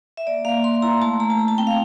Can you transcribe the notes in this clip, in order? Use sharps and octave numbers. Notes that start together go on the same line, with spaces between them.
E5
A#3 D5
A#3 F5
A#3 C6
E4 A#5
A3 A5
A3 A#5
A5
A3 A#5
A5
C4 G5
F5